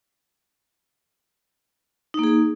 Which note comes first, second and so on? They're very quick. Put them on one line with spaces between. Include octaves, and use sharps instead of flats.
D#4 A#3 G#4